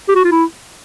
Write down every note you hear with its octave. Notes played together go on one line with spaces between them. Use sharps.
G4
F#4
F4
E4